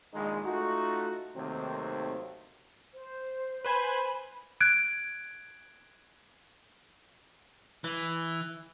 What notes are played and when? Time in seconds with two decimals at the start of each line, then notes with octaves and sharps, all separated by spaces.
0.14 A#1 D#3 G#3
0.45 A3 D#4 F4 F#4
1.36 D#2 C3 D#3 F#3 A3 C4
2.96 C5
3.65 B4 C5 G#5 B5
4.61 F#6 G#6 D7
7.84 E3